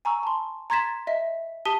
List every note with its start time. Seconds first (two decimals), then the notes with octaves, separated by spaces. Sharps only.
0.05 G#5 A#5 C#6 E6
0.23 A5 C6
0.70 A#5 C6 G#6 A6 B6 E7
1.07 D#5 E5 B6
1.65 G4 A5 D#6 B6 D#7 G7